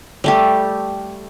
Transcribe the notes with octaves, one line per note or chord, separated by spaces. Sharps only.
G3 A3 G4